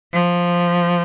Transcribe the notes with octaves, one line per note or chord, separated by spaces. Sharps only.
F3